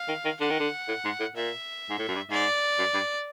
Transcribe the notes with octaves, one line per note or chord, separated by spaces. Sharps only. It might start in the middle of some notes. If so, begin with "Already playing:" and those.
Already playing: F5
D#3
D#3
D3 F#5
D#3
D3
A2
G#2
A2
A#2 E5
G#2
A2
F#2
G2
G#2 D5
F#2
G2